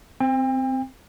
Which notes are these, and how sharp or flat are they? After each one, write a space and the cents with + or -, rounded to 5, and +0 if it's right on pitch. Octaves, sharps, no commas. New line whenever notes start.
C4 -10 G5 +35